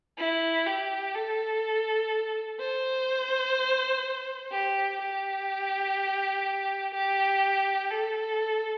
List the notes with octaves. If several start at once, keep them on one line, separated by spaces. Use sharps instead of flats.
E4
G4
A4
C5
G4
G4
G4
A4